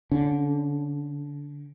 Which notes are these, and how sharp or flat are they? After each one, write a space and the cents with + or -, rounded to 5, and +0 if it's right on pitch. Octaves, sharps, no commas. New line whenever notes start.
D3 -25 C#4 +0